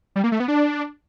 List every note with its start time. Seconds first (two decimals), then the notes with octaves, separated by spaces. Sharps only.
0.16 G3
0.24 A#3
0.32 A3
0.40 B3
0.48 D4